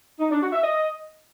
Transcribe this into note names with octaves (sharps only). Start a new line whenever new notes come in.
D#4
D4
F#4
E5
D#5